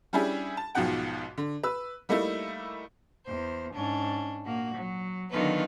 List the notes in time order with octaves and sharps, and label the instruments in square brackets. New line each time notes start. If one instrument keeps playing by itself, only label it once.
[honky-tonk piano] G3 C#4 D4 E4 G4 G#4
A5
B1 G#2 B2 F3 F#5 G5
D3
B4 E6
G3 A3 A#3 D#4 E4
[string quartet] E2 C5
G#2 C#4 D4
A#2 A#3 F#4
F#3
D3 D#3 F#3 B3 F4 B4